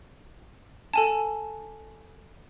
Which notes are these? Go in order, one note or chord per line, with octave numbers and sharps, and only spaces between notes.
A4 G#5 A5